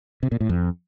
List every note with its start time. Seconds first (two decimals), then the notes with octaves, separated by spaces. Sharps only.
0.23 C3
0.32 A#2
0.40 A2
0.49 F2